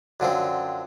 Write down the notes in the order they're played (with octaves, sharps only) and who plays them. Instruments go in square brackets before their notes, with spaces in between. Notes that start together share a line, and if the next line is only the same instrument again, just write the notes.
[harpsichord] F#2 D3 F3 C4